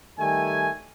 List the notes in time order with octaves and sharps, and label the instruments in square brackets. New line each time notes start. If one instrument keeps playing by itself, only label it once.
[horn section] D#3 G3 A3 G#5